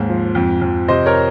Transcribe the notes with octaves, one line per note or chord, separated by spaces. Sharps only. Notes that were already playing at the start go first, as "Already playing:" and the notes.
Already playing: D#2 G#2
F3
F2
F2
C3 C5 D#5
A#4 C#5